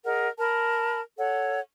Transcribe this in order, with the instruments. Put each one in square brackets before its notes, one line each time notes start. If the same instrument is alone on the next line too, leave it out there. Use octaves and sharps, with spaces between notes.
[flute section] G#4 A#4 D#5 F#5
A#4 A5 B5
A4 C#5 F#5